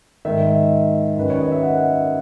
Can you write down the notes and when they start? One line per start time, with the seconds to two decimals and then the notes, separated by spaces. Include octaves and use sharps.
0.25 G#2 D#3 E5
1.17 F#2 D#3 B4
1.30 C#5
1.41 D#5
1.52 E5
1.63 F#5